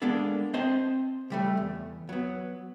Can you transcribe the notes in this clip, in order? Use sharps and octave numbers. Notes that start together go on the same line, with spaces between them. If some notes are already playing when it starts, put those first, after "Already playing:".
G#3 A#3 B3 D4 A4
C4 C5 D#5 A5 C6
C#2 G3 A3
E2
F#3 B3